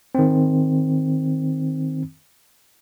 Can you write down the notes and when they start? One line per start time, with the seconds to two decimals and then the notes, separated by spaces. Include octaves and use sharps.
0.15 D#3 C4